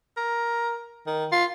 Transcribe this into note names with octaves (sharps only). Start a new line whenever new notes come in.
A#4
D#3
F4